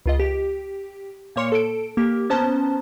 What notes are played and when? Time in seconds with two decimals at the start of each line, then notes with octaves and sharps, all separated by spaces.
0.06 C#2 F4 D#5
0.19 G4
1.36 A#2 A#3 C#5 C6 C#7
1.52 A4 D7
1.97 A#3 G4
2.30 B3 C#4 C5 A5 A#5